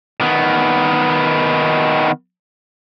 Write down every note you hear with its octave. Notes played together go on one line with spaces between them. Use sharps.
D#3 B3